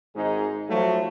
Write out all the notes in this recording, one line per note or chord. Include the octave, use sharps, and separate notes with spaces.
G#1 G#2 D#4 G#4
F3 F#3 A3